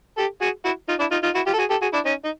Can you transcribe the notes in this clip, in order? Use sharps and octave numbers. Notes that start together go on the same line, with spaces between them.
G4 A4
F#4 G#4
E4 F#4
D#4 F4
D4 E4
D#4 F4
D#4 F4
E4 F#4
F4 G4
A4
F#4 G#4
G4 A4
F#4 G#4
D4 E4
C#4 D#4
D#4